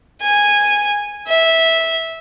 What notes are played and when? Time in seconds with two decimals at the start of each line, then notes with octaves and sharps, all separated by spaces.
0.22 G#5
1.27 E5